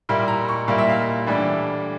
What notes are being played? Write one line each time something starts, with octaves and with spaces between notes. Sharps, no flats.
A#2 G3 A#3 E4
A#5
C#6
A#2 G3 A#3 E4 F5
E5
F5
A2 E3 G3 D4